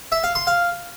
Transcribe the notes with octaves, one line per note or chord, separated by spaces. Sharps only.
E5
F5
C6
F5